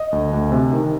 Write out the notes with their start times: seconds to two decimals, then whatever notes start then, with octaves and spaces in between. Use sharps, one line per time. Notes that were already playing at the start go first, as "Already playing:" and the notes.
Already playing: D#5
0.12 D2
0.33 D2
0.52 C3
0.73 D#3